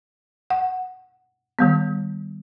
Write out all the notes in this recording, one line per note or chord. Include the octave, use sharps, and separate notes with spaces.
F#5
D#3 G3 B3